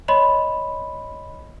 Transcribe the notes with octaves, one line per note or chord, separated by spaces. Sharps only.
C#5 D#5 B5 C6